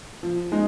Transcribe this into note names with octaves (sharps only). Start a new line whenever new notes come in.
F3
G#3 D#4